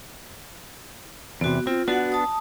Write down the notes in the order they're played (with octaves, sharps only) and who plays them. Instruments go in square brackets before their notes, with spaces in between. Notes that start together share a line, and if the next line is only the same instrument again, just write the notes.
[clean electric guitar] E2 C3 [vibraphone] B3 F#4
[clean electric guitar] C4 [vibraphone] F4
[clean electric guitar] B3 D4 [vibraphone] F#4 F#5
[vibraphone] A5 D#6